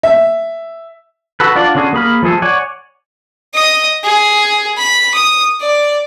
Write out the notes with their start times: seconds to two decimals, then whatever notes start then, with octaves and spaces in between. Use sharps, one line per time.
0.03 E5
1.40 F#4 A4 B4
1.56 D4 F4 D5 F#5
1.75 D3 C#4 D4 F#4 G#4
1.93 A#3 G#4 B5 F6
2.23 F3 A3 G#4 A4
2.42 C#5 D5 F#5 G#5
3.54 D#5 D#6
4.04 G#4
4.77 B5
5.14 D#6
5.61 D5